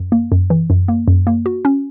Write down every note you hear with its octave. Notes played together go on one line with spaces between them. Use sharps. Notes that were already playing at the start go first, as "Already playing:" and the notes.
Already playing: F#2
A#3
F#2
E3
F#2
A#3
F#2
A#3
F#4
C#4